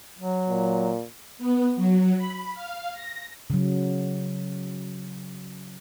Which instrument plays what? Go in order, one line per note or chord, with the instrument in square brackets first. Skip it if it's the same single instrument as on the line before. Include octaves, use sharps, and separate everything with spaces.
[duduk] F#3
[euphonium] A#2
[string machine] B3
F#3
B5
F5
A#6
[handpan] C#3 F#3